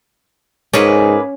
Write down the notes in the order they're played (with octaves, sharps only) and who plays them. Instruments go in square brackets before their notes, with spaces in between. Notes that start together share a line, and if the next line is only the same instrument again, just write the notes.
[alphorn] G#2 [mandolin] A#3 G#4 B4 [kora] C#4